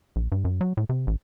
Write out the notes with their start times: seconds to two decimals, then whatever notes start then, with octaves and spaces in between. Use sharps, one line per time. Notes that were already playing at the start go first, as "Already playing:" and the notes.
0.16 A#1
0.32 G2
0.45 F#2
0.61 F#3
0.77 A2
0.89 C3
1.07 A1